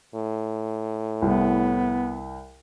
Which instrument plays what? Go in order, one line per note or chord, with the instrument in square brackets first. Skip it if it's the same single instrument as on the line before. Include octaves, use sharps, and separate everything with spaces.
[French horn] A2
[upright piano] C2 [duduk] B3